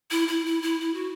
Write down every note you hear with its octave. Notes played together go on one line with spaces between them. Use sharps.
E4
E4
E4
E4
E4
F#4